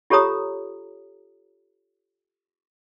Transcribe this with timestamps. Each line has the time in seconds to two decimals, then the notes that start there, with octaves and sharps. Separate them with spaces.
0.10 F4 G4 A4 C#5 A#5 D#6